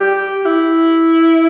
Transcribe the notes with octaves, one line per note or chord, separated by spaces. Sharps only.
G4
E4